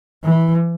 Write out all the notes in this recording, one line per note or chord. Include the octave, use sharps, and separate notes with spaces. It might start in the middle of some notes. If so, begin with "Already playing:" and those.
E3